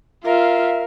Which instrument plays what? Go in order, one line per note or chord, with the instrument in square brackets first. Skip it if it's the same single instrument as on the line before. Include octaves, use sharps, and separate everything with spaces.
[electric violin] F4 [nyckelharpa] A#4 [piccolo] E5 [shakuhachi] F5